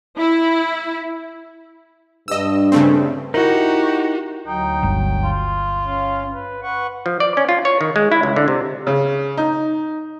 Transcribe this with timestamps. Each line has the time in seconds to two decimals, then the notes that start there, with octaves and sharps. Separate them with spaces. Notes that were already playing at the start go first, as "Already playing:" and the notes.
0.16 E4
2.28 G2 D#5 E6
2.72 C#3 A3 C4
3.34 D#4 E4 F#4 G4 A#4
4.47 D2 F#3 D#4 G5
4.83 G1
5.24 F4
5.84 C#4 F5
6.32 B4
6.62 B4 F#5 C#6
7.06 F3
7.20 D5
7.37 C#4
7.49 F4
7.65 C#5
7.81 D#3
7.96 G#3
8.12 E4
8.23 C#2
8.36 D3
8.48 C3
8.87 C#3
9.37 D#4